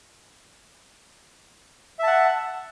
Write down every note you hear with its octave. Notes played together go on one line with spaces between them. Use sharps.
E5 F#5 A5